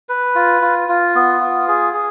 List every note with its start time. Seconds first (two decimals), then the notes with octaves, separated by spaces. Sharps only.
0.09 B4
0.35 F4
0.62 F4
0.89 F4
1.15 B3
1.41 F4
1.68 G#4
1.93 G#4